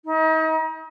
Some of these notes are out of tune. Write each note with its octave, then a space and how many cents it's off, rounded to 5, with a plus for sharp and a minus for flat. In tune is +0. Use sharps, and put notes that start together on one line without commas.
D#4 +35